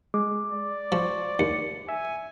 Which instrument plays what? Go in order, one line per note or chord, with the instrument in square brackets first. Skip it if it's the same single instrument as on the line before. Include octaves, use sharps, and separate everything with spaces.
[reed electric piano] G#3 [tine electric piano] D6
[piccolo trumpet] D5
[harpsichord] F3 [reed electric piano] C5 C#6
[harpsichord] D#2 [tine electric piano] C#7
[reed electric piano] E5 [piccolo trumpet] G#5